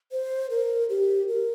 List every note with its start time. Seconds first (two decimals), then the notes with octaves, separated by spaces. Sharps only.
0.12 C5
0.50 A#4
0.89 G4
1.28 A#4